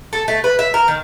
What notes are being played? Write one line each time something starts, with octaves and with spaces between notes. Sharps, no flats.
A4
A3
B4
E5
A#4
D#3